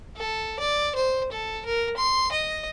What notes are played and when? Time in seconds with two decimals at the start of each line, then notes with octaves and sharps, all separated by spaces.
0.17 A4
0.59 D5
0.95 C5
1.32 A4
1.66 A#4
1.97 C6
2.32 D#5